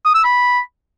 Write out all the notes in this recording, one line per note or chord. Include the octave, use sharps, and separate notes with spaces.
D#6
E6
B5